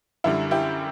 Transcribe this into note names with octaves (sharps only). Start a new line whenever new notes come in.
F#2 D3 G3 E4
E4 G4